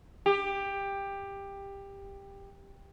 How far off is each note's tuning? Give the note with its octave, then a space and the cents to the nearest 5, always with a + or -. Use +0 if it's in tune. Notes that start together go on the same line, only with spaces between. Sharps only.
G4 +15